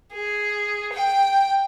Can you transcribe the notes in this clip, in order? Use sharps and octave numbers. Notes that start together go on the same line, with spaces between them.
G#4
G5